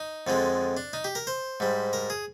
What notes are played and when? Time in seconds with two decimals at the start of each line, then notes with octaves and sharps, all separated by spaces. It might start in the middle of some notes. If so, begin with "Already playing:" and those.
Already playing: D#4
0.27 F2 D3 F3 G#3
0.77 D4
0.93 D#4
1.04 G4
1.15 A#4
1.27 C5
1.60 G#2 G3
1.93 A#4
2.10 G#4